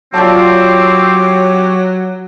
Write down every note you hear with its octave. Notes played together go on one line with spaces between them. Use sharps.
F#3 C4 F4 G4 C#5 D5 A5 D6